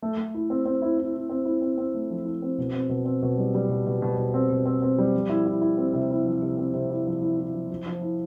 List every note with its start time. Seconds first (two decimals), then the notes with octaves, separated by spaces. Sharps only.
0.02 A3
0.17 A3
0.34 E4
0.50 C4
0.66 C4
0.82 E4
0.98 E4
1.14 E4
1.29 C4
1.45 E4
1.62 C4
1.78 C4
1.94 A3
2.10 F3
2.25 E4
2.42 C4
2.58 B2
2.74 C4
2.89 B2
3.05 C4
3.22 B2
3.38 G3
3.54 G3
3.69 B2
3.86 B2
4.02 B2
4.17 B2
4.34 C4
4.50 B2
4.66 C4
4.82 C4
4.98 G3
5.13 F3
5.29 E4
5.46 E4
5.62 E4
5.78 C4
5.93 C3
6.10 E4
6.25 F3
6.42 C3
6.57 C4
6.74 C3
6.90 E4
7.06 F3
7.22 E4
7.38 E4
7.54 F3
7.71 F3
7.86 F3
8.02 E4